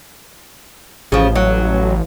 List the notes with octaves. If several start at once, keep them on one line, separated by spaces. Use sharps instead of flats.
A1 C#3 F3
F#3